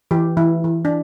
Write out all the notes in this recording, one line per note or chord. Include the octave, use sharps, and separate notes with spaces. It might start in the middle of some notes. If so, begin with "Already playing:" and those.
E3 G4
E3 E4
E3
D4